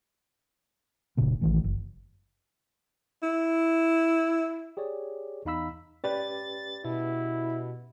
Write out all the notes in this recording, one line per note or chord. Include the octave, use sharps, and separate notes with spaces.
F1 A#2 C#3 A#3
A1 D#3 E3 A3
F#1
E4
G4 G#4 C#5 D5
E2 D#4 F5 B5 E6 B6
C#4 G4 B4 D5 A6
B2 E4